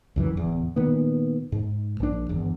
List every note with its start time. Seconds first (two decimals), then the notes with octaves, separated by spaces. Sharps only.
0.16 C#2 F#2 E3
0.33 D1 E2
0.76 A#2 D#3 B3
1.52 G#2
2.00 A#1 D4
2.29 G1 E2